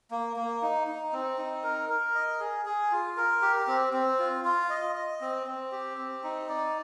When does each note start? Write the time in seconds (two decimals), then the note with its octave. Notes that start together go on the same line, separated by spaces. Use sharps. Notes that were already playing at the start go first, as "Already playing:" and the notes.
0.11 A#3
0.36 A#3
0.62 D#4
0.87 D#4
1.13 C4
1.38 D#4
1.63 A#4
1.89 A#4
2.15 D#5
2.40 G#4
2.66 G#4
2.91 F4
3.17 A#4
3.42 G4
3.67 C4
3.93 C4
4.19 F4
4.45 F4
4.70 D#5
4.96 D#5
5.21 C4
5.47 C4
5.72 G4
5.98 C4
6.24 D#4
6.49 D5